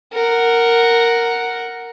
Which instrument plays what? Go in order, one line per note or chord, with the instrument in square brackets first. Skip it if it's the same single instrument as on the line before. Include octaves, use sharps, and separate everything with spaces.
[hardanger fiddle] A#4 F#5